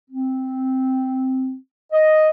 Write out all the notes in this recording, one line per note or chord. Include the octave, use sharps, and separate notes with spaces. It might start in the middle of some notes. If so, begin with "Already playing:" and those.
C4
D#5